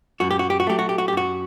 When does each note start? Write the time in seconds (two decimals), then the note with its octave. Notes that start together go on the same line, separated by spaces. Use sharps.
0.20 F#2 F#4
0.31 G4
0.39 F#4
0.50 G4
0.60 F#4
0.67 F#3 A3 G4
0.79 F#4
0.89 G4
0.98 F#4
1.08 G4
1.13 F#2 F#4